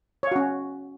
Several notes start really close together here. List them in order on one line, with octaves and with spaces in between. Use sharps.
C#5 F5 F#4 C#4